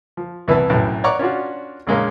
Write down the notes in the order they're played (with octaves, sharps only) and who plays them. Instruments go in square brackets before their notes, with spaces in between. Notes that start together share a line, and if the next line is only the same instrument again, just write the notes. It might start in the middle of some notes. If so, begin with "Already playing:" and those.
[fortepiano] F3
C2 E3 B3 E4 A5
B1 F#2 A2 A5
C#5 D5 F#5 A#5 C#6 D6
C#4 D4 F4 F#4
A#1 C#3 G#3 A#3 C#4